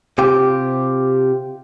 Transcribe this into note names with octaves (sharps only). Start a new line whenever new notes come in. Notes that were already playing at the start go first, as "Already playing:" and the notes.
C3 F4 G4